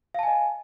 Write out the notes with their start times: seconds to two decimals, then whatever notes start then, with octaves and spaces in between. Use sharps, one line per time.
0.14 F5
0.19 A5
0.23 G#5
0.27 D#5